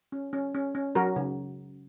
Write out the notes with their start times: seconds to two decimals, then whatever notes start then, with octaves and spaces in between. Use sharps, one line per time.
0.12 C#4
0.33 C#4
0.55 C#4
0.75 C#4
0.95 F#3 F#4 A#4
1.16 C#3